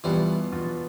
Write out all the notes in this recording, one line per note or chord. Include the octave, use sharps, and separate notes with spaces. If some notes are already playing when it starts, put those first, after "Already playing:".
E2 B2 E3 G3 B3 F4
E2 B2 B3 F4